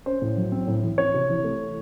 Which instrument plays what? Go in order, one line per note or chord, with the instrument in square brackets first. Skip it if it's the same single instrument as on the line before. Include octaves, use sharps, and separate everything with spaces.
[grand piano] C#4 C5
A2
F#3
C4
A2
E3
C4 C#5
C3
E3
A3